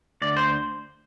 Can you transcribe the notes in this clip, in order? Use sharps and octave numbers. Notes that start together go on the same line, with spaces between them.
D2 D5
C5